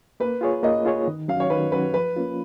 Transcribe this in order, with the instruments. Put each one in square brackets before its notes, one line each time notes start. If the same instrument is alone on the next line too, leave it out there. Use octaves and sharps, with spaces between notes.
[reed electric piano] A#3 [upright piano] B4
[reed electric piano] F4 G#4 C#5
[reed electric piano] A#3 [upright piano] D#5
[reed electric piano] F4 G#4 C#5
D#3
[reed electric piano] F#3 C#4 F#4 [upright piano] F5
[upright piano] C#5
[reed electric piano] D#3 [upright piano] B4
[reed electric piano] F#3 C#4 F#4 [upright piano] B4
[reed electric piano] F3 [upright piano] B4
[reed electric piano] A#3 C#4 F4